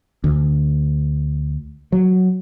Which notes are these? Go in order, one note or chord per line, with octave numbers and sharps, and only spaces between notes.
D2
F#3